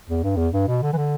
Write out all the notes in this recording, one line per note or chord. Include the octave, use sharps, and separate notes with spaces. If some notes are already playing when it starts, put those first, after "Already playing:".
E2
G2
E2
G2
B2
D3
E3
D3